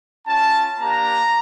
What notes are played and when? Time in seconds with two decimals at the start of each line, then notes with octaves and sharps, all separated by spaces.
0.27 C#4 F4 A5
0.79 A#3 D4 G4 A#5